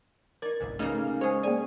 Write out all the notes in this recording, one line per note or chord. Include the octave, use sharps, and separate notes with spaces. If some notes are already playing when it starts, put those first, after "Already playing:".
D#4 A#4 D5 G#6
G1 C2 G#2
C#3 A3 A#3 D#4
G#3 G#4 C5 C#5 G#5
A#3 G#4 D5 G#5